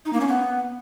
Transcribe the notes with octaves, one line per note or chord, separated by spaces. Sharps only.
D#4
A#3
C#4
B3